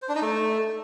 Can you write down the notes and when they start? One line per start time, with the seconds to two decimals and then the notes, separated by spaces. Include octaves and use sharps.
0.02 C5
0.09 D4
0.15 D#4
0.22 A3